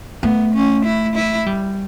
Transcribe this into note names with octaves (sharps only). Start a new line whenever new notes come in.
A3 B3
C#4
E4
E4
G3